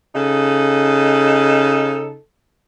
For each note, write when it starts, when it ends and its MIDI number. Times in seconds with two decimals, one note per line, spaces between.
0.15 2.16 49
0.15 2.16 63
0.15 2.16 69